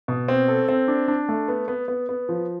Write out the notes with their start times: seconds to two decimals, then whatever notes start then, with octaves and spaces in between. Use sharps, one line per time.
0.08 B2
0.28 C4
0.48 A4
0.69 C4
0.88 D4
1.08 D4
1.29 A3
1.48 B3
1.68 B3
1.88 B3
2.09 B3
2.29 F3